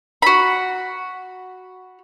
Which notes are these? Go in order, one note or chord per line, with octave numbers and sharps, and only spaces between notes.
F#4 B5